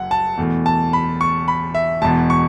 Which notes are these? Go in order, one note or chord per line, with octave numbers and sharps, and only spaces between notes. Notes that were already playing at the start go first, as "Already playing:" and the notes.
Already playing: F#1 F#2 F#5
A5
E2 B2 A3
A5
B5
C#6
B5
E5
E1 E2 B2 A5
C#6